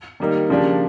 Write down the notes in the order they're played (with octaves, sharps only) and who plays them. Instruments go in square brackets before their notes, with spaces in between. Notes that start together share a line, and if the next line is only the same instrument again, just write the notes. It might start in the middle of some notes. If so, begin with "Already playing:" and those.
[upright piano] D#3 G3 A#3 D#4
C#3 F3 A#3 D4 G4